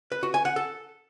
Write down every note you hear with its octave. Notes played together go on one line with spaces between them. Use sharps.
B4
F#4
G#5
F#5
A4